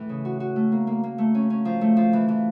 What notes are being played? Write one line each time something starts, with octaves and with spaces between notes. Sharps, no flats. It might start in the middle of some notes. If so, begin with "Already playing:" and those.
Already playing: A2 E3
C#3
F#4
F#4
A3
A#3
A#3
A#3
A3
C#4
C#4
F3
A3
F3
E3
E3